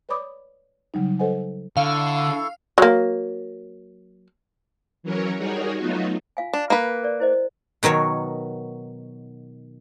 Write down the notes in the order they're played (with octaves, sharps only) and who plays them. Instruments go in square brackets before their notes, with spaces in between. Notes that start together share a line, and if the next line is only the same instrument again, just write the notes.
[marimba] B4 C#5 D5 B5 D6 D#6
C#3 F#3 G3 D#4
A4 B4 C5 D#5 F#5 G#5
[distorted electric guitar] D3 [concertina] E4 A4 C#6 [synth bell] F5
[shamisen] F#3 A#3
[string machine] E3 F#3 C#4 A#4 C#5
G3 D#4 F#4 G#4 A#4 C#5
F#3 A3 B3 D#4 F4 F#4
[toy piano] F4 F5 G#5
[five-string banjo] D4
A#3 B4
[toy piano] A#4 D5
E4 C5 D#5
[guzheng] B2 D#3 F#3 C#5